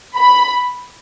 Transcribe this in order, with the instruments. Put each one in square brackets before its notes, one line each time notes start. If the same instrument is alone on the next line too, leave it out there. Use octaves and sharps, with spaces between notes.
[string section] B5